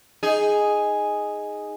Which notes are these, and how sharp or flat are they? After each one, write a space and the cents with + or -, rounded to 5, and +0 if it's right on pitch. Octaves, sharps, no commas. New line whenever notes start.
D#4 +0 G#4 +0